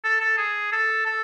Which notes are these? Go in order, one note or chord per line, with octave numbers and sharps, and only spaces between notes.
A4
A4
G#4
A4
A4